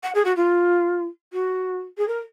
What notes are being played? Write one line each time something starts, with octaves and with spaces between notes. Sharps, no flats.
F#5
G#4
F#4
F4
F#4
G#4
A#4